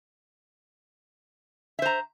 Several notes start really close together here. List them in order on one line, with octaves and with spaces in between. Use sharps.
E5 C5 A#5